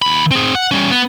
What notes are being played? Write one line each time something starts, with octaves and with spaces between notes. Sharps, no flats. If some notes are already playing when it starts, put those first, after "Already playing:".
D#2 B5
C4 G#4
F#5
G3 C#4
B3